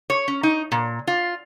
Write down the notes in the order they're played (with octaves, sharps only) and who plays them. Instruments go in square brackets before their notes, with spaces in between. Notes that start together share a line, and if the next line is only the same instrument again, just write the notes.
[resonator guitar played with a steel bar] C#5
C#4
D#4
A#2
F4